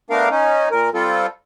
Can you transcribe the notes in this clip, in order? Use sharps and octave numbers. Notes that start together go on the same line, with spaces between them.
A3 B3 D4 A#4 F5
C#4 D#4
A#2 A#4
G3 C4 F4 A4